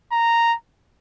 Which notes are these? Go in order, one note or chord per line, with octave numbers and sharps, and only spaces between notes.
A#5